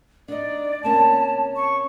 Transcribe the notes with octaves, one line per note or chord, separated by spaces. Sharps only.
D4 D#4 D5 D#5
C3 A#3 C#4 A5
C#6